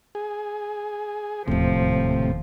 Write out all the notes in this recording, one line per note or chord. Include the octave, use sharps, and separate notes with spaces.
G#4
E1 D#2 A2 C3 F3